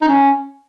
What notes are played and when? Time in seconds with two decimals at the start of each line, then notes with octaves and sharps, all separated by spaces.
0.02 D#4
0.08 C#4